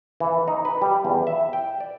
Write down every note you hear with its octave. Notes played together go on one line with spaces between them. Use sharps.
E3
D#4
B4
G3
E2
E5
G5
D5